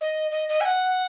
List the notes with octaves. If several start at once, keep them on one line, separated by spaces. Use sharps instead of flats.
D#5
D#5
D#5
G#5
F#5